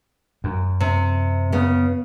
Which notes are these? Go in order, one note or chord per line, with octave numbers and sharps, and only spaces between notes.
F#2
C3
C#3 B3